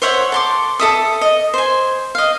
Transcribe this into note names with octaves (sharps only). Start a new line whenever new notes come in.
C5 C#5 E5 F#5
A4 C6 D6
A4 E5 D#6
D#5
C5 G#5
D#5 F5